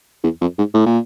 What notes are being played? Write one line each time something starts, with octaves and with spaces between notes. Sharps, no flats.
E2
F2
G#2
A2
A#2